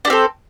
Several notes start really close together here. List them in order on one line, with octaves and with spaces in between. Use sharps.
D4 G4 C4 A4